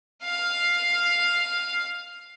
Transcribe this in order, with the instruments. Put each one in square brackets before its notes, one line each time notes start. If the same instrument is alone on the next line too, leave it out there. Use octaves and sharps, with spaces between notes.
[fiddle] F5 F6